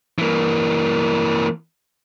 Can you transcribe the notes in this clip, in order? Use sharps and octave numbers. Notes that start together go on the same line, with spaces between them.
E3 A#3